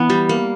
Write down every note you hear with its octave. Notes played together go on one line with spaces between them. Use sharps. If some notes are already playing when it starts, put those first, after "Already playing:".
Already playing: E3 B3
G3
A#3